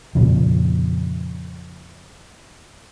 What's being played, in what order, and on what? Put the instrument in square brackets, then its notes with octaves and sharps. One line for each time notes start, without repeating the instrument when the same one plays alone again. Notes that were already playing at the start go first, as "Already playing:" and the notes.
[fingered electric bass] F2 A#2 C#3 F3